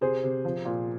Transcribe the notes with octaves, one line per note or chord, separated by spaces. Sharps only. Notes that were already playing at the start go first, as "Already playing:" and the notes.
C3 G#4 C5
C3
F3
A#2